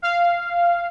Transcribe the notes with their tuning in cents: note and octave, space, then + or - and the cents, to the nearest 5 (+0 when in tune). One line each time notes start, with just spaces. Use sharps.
F5 -10